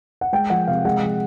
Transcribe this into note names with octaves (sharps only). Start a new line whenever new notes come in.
F#5
G#3 G5
F3 F#5
C3 F5
G#3 F#5
F3